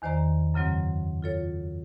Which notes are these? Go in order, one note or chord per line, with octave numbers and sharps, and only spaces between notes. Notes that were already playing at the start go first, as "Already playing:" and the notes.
E2 D#3 C5 D5 A#5
F#2 C#3 F#3 C4
F4 A4 C#5